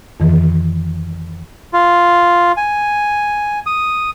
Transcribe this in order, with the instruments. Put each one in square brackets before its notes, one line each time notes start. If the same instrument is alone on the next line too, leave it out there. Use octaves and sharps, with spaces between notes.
[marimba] F2 D#3 E3
[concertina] F4
G#5
D#6